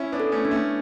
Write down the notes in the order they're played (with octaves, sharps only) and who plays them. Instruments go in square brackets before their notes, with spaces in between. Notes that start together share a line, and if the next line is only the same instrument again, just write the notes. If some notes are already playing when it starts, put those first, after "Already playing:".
Already playing: [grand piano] C#4 E4
B3 D4
[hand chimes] A4
[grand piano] A3 C#4
[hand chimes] D4
[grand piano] A3 C#4